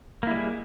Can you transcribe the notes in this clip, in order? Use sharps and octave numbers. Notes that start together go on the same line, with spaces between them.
G3 G#3 A#3 E4